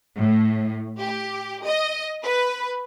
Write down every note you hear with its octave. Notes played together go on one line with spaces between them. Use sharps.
A2
G4
D#5
B4